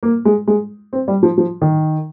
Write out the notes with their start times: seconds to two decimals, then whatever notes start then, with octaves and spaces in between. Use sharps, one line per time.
0.03 A#3
0.25 G#3
0.47 G#3
0.93 C4
1.08 G3
1.23 F3
1.38 F3
1.62 D#3